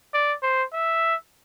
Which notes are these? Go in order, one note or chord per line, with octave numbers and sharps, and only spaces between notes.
D5
C5
E5